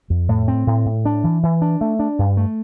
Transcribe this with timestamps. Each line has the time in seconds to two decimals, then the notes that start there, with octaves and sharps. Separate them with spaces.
0.10 F2
0.29 A2
0.48 C4
0.67 A2
0.86 A2
1.05 D4
1.24 E3
1.43 E3
1.62 D4
1.81 A3
1.99 D4
2.19 G2
2.37 A3